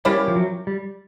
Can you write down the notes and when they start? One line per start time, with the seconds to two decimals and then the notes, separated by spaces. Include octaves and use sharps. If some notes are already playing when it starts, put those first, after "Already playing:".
0.05 G3 A#3 C#4 E4 G4
0.28 F3
0.36 F#3
0.67 G3